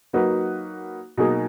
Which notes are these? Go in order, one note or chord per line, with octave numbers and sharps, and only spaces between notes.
F#3 A#3 D#4 F#4 B4
B2 F#3 A#3 D#4 G#4